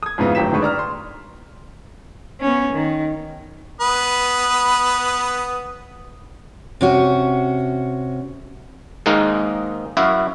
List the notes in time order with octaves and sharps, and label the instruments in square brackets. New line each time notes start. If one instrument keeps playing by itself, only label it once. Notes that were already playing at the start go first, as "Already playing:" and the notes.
[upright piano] D#6 G#6
F2 G#2 C#3 E3 B3 F4
G1 A2 F#3 G5 B6 E7
G1 D3 D#3 G#3 B4 C#6
D5 A#5 F6
C6
[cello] B3 C#4
D#3
[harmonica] B3 B4 D#6
[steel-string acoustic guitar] C3 C#4 F#4
[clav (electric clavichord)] G#2 D#3 G#3 A#3 D#4 A#4
F#2 E4 F#4 E5 F5